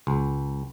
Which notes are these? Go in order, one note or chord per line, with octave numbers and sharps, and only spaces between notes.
C#2